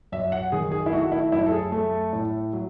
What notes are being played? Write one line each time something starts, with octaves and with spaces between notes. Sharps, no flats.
F#2 E5
F#5
D#3 G#4
G#4
E4
A3 F#4
E4
F#2 E4
A4
G#4
A3 A4
A2
F#3